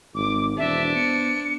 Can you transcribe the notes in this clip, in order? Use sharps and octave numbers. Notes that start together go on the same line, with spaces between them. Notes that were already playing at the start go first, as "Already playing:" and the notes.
G#1 D6
E1 D4 C5 E5
B3 C#7